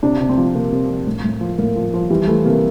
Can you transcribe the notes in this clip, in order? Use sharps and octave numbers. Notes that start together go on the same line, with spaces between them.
C3 D4
C3
C4
F3
C3 A#3
C3
F3
A2
A2
F3
A2 A#3
F3
F3
E3 G3
E3 A3
C3 A#3